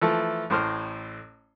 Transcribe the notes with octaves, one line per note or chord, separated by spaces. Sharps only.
E3 F3 A3 A4
A1 A2 C5 F6